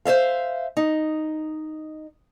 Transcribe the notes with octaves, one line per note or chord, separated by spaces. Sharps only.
C5 C#5 E5 F5
D#4